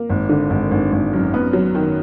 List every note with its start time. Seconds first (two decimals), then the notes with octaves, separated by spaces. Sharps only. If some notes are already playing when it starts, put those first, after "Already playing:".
Already playing: A#3
0.10 G#1
0.29 D3
0.50 G#1
0.71 G#1
0.92 G#1
1.13 F#2
1.34 B3
1.53 F#3
1.75 D#3